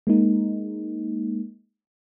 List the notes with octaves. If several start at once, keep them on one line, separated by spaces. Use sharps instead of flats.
G#3 A#3 D#4